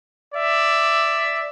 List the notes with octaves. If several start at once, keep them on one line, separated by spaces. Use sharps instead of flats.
D5 E5